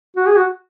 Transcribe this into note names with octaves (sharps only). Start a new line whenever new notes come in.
F#4
G#4
F#4